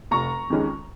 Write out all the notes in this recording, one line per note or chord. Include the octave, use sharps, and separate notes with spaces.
F1 A#5 C#6
F2 D#3 G#3 C#4